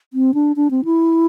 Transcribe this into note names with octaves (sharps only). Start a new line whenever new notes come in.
C4
D4
D4
C4
E4